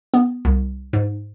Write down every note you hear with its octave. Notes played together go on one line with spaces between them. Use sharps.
B3
C2
G#2